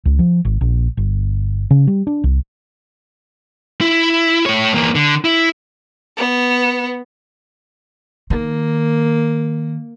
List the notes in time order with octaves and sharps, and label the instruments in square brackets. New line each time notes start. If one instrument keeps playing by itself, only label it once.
[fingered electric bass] C#2
F3
G#1
A#1
G1
C#3
G3
D4
C2
[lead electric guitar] E4
A3 C#5
E2 A#3
D3
E4
[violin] B3
[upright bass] D#3 [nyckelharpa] A#3